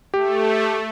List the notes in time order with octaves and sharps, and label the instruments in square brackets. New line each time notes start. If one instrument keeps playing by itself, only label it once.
[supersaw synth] A3 [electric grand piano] G4